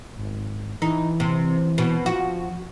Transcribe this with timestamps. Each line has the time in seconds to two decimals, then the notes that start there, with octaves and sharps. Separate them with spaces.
0.16 G#1
0.82 E3 D#4
1.20 C3
1.78 B2
2.06 F3 F#4